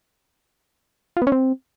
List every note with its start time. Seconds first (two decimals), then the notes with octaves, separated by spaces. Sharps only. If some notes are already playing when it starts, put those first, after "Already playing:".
1.17 F4
1.22 B3
1.27 C#4
1.32 C4